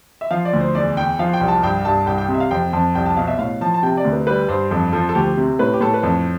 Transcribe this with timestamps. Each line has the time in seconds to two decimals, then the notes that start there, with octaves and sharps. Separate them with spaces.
0.21 E5
0.31 F3 F5
0.45 D5
0.53 D2
0.60 C5
0.75 E2 D5
0.97 E2 G5
1.19 F3 F5
1.33 G5
1.41 C2
1.48 A5
1.63 G2 G5
1.85 G2 A5
2.06 C2 G5
2.18 G5
2.28 C3
2.34 E5
2.40 F5
2.51 F2 G5
2.73 F2 A5
2.95 C2 G5
3.06 A5
3.17 B2 F5
3.27 E5
3.39 A2 F5
3.61 F3 A5
3.74 A5
3.83 C3 G5
3.97 D5
4.04 D2
4.13 B4
4.27 G3 B4
4.49 G2 C5
4.71 F2 A4
4.93 F3 A4
5.09 A4
5.15 D2 G4
5.37 C3
5.59 A2 B4
5.73 G4
5.81 A2 A4
5.94 B4
6.03 F2 A4